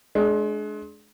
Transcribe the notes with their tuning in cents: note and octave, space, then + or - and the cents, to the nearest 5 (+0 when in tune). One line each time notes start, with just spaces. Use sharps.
G#3 +30 D4 +0